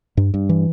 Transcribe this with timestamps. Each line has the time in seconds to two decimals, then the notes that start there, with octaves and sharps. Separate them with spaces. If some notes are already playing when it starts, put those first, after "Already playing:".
0.17 G2
0.34 G2
0.49 E3